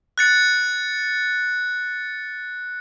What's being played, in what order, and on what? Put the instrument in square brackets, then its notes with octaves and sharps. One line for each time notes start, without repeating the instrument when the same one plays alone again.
[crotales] F#6 A6 C#7